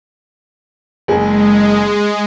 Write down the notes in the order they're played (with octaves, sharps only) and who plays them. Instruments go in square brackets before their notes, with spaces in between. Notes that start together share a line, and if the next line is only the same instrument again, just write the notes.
[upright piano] F#1 G#4 [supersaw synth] G#3